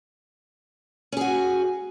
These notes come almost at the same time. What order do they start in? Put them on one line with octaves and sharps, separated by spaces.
C#4 G#4 F#4